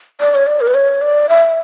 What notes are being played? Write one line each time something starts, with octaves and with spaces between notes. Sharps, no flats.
D5
C#5
D5
A#4
B4
C#5
D5
E5